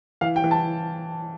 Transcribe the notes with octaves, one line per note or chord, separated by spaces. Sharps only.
E3 F5
G5
E3
A5